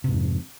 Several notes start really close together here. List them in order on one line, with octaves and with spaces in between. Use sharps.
C3 G#2 F2